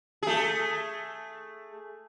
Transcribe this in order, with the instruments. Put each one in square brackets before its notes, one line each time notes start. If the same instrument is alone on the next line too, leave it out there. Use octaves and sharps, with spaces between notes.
[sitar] A3 G#4